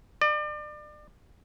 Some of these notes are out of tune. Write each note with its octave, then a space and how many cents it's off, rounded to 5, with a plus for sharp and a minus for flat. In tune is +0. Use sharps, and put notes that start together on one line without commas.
D5 +35